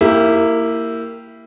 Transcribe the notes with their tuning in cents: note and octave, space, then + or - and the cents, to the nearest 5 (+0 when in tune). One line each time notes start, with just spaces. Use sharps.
A#3 -20 E4 +0 G4 +0